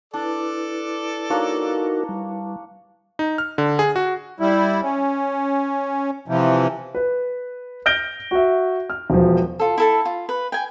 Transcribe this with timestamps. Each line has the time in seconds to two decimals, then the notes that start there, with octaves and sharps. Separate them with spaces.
0.14 D4 E4 A4 B4 D5
1.30 A#3 D4 D#4 F#4 A#4 C#5
2.09 G3
3.19 D#4
3.38 F6
3.58 D3
3.79 G#4
3.96 F#4
4.40 G3 E4
4.82 C#4
6.28 C3 E3 F3
6.95 B4
7.86 F6 G6 A#6 D7 G7
8.31 F#4 E5
8.90 F6
9.10 E1 F3
9.59 F4 A4
9.78 E4 A4 A5
10.05 F4
10.29 B4
10.52 G5 G#5